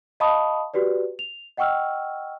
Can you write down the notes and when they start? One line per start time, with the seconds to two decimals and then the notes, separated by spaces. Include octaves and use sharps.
0.20 D#5 F5 A5 B5 C#6 D#6
0.74 F#4 G4 B4 D5
1.19 F7
1.57 D#5 F#5 G5 C#6 E6 F6